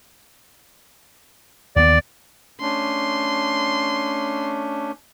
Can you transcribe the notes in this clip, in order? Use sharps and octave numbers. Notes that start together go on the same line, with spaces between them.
D#2 A#3 B3 D5
A3 C#4 D4 C6